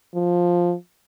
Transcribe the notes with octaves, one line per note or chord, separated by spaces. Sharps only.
F3